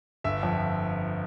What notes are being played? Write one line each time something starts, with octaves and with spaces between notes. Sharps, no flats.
G1 E5
F2